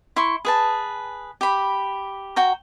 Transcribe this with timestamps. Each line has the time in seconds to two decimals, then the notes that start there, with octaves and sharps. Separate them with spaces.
0.16 E4 C6 C#6
0.45 G#4 B4 A5
1.41 G4 B5
2.36 F#4 G5 A#5